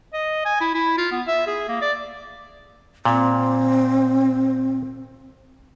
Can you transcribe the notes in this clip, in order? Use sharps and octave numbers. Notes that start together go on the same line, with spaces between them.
D#5
G#5
E4
E4
F4
B3
E5
G#4
A#3
D5
A#2 C4